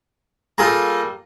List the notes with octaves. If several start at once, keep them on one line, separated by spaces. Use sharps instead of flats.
G3 A#3 F4 G#4 A4 A#5